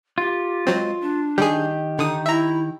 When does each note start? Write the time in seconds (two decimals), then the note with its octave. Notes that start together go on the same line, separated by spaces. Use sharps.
0.18 F4 G4
0.67 F#3 G#3 C4
1.00 D4
1.38 D#3 G3 G4 G#4
1.99 D3 D#4 D#6
2.26 E4 E5 A#5